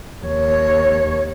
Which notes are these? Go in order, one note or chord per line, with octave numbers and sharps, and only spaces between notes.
D#2 C#5